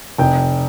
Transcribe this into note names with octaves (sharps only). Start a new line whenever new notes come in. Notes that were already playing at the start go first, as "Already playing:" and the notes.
F1 G5